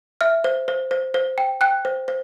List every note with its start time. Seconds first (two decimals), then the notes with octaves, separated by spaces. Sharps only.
0.21 E5 F6
0.44 C5
0.68 C5
0.91 C5
1.14 C5
1.38 G5
1.61 G5 F#6
1.85 C5
2.08 C5